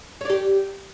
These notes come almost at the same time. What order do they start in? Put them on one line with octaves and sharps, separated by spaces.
C#5 D5 G4